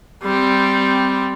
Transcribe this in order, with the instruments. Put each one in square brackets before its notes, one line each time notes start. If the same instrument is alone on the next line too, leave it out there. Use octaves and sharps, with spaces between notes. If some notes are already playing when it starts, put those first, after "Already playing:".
[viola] G3 C4